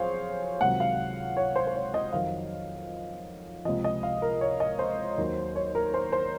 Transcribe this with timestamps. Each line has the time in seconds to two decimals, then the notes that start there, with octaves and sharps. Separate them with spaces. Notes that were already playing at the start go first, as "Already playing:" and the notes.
Already playing: F2 F#3 G#4 C5 C#5 F5
0.61 C#2 C3 D#3 F#3 F#5
0.80 F5
1.37 C#5
1.56 C5
1.67 C5
1.75 C#5
1.94 D#5
2.13 F2 D#3 F#3 F5
3.65 C#2 C3 F3 D#5
3.84 D#5
4.03 F5
4.22 A#4
4.41 C#5
4.60 D#5
4.79 C5
5.18 D#2 D#3 F#3
5.56 C#5
5.75 A#4
5.94 C5
6.12 C5